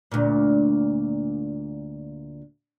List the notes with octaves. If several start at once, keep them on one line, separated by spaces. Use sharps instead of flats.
D2 A#2